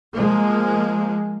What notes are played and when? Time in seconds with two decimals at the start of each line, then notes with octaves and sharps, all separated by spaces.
0.13 F3 G#3 A#3